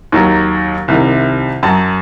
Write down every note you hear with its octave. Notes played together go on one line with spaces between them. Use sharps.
D#2 D#3 F#3
C2 C3 D#3
F#2 F#3 A5